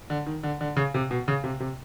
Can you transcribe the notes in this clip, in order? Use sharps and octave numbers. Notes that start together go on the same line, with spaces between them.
D3
D#3
D3
D3
C#3
C3
B2
C#3
C3
C3